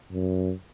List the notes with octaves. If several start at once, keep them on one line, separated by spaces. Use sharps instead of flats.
F#2